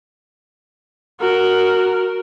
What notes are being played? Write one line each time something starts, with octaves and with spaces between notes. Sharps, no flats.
F#4 A#4